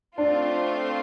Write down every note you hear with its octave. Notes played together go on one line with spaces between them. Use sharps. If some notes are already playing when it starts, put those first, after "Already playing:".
A3 C4 D4 F4 D5